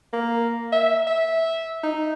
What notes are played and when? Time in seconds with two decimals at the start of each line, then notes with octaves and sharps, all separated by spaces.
0.13 A#3
0.72 E5
1.07 E5
1.83 D#4